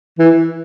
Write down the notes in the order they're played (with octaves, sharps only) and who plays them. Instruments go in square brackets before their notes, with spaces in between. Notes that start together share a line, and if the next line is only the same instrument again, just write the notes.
[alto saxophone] E3